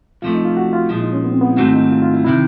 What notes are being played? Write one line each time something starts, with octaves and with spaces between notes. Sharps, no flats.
C2 C3 F3 A3 F4
D#4
F4
F#4
F4
A#2 F3 G#3 E4
D#4
C#4
B3
C4
B3
E4
G#2 D#3 F#3 A3 C4 F#4
E4
D#4
F4
F4
E4
C3 D#3 E4